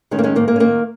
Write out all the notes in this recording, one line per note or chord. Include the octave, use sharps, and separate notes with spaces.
D#3 G#3 C#4
A#3
G#3 C#4
G#2 A#3
A#3
C#4
D#3 A#3